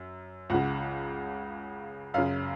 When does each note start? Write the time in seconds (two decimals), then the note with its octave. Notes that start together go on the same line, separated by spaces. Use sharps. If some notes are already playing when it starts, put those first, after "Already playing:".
Already playing: F#2
0.50 C#2 C#3 F#5
2.14 F#2 F5
2.18 C#3